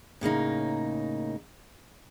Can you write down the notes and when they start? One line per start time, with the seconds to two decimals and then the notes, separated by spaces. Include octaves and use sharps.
0.21 A2 C#3 A#3 D#4